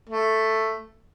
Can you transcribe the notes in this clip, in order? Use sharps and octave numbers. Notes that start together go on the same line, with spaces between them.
A3